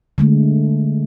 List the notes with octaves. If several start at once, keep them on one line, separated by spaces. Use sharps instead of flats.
D3 G#3 A3